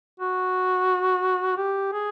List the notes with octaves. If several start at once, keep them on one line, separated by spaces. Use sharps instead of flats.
F#4
G4
G#4